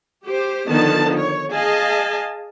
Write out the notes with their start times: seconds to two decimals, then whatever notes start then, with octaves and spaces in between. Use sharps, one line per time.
0.23 G4 C5
0.67 D3 D#3 F3 B3 A5
1.18 C#5
1.52 G#4 D#5 F5 G#5 A5